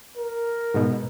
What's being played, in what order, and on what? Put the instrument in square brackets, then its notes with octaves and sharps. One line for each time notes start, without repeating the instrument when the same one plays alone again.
[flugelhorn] A#4
[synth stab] G#2 B2